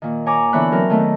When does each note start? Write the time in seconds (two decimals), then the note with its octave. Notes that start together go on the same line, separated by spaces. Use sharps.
0.02 A#2 D#3
0.26 C#5 G#5 A#5 D6
0.53 D3 E3 B3 C#5 B5 F#6
0.72 F#3 C4 A#4
0.90 D#3 A3 B3